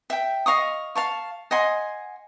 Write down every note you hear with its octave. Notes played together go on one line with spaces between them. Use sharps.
E5 G5
D#5 F5 C#6 D#6
F5 A5 C#6
D#5 F#5 G#5 C6